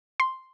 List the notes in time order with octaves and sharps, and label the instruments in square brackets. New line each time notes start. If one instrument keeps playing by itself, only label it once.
[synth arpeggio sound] C6